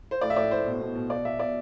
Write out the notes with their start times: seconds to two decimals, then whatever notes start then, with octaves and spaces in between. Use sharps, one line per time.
0.11 C5
0.21 A2 D5
0.30 E5
0.36 A2 D5
0.51 A2 C5
0.66 B2
0.81 B2
0.95 B2
1.10 B2 D5
1.25 B2 E5
1.39 B2 D5